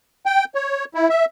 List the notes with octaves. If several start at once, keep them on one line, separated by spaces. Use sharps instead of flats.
G5
C#5
E4
E5